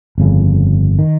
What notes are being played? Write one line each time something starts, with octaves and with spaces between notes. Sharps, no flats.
G1 F2 C#3
D#3